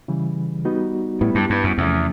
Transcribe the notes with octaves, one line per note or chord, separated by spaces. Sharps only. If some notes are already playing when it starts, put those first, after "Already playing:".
C#3 E3 G3
G3 B3 D#4 F#4
A2 G3 B3 E4
G2
G2
F#2
E2 C3 F3 A3 C#4